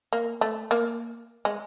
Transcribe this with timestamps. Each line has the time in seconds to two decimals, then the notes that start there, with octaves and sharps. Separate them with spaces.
0.13 A#3
0.41 A3
0.71 A#3
1.45 G#3